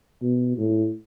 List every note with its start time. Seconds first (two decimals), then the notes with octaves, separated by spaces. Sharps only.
0.22 B2
0.57 A2